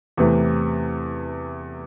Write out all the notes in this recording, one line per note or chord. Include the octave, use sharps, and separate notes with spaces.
E2 C3 E3 A3